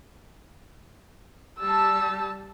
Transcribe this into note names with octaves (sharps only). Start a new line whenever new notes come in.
G3 A5 E6